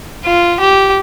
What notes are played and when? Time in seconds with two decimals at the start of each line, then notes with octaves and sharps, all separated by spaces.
0.25 F4
0.60 G4